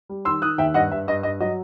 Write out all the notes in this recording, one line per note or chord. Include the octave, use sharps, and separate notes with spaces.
G3
D#3 C6 E6
D#3 D#6 F#6
D#2 E5 G5
G2 D#5 F#5
G2 E5
G2 D#5
G2 D#5
F#3 D#5